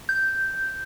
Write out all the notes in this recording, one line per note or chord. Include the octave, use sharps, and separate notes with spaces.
G6